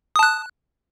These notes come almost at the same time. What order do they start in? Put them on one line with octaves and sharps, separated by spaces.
D#6 A5 F#6